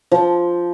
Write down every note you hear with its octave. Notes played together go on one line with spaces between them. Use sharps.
F3